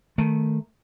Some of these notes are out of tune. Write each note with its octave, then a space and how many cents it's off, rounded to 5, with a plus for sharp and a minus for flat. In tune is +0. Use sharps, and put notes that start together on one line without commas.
D#3 +0 A3 +0